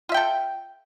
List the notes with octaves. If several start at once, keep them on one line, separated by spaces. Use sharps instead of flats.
F4 A4 E5 G5